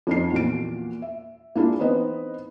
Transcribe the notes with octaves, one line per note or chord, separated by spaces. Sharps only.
F2 D#4 C7
E2 A#2 F#4 D7
E5
A#3 D4 E4 F4 G#4
E3 B3 C4 D#4 B4 D#5